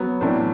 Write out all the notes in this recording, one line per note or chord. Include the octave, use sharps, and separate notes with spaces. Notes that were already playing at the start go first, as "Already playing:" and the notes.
Already playing: F#3 B3
A2 E3 A3 D4